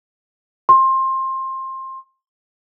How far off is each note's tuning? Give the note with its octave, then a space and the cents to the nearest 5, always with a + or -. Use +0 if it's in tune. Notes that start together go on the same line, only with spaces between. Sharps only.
C6 +20